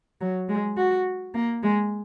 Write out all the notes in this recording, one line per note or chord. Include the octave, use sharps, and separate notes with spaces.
F#3
G#3
F#4
A#3
G#3